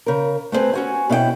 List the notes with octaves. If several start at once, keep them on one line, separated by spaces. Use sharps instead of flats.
C#3 A#4
A3 B3 C4 G#4 B4
C#4 F#4 G#5
B2 C#4 E4 D5 G5